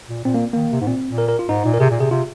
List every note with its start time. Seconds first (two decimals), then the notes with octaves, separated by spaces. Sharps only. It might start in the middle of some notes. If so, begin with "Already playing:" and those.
0.09 A#2
0.25 A#2 C4
0.34 A#3
0.53 D#3 A#3
0.72 C3
0.81 G#2
0.87 A#2 C4
1.08 A#2
1.18 A#4
1.28 A#4
1.39 F4
1.49 G#2 D#4
1.65 A#2
1.74 A#4
1.80 C3 G#4
1.91 A#2
2.01 C3 G#4
2.11 C3 F4